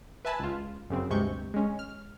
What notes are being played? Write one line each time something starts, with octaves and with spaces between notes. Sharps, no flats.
B4 E5 G#5 A5 B5
C#2 F4
F#2 C#3 C4
D2 G2 C3 G#3 C#6 G6
G#3 C#4
F6